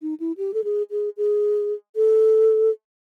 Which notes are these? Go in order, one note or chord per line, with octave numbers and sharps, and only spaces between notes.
D#4
E4
G4
A4
G#4
G#4
G#4
A4